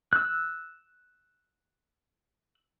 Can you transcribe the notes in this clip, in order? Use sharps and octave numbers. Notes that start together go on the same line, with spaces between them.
E6 F#6